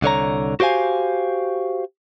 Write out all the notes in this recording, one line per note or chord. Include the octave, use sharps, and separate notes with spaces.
C2 D3 C#5 A#5
F#4 G4 C5 F5 G#5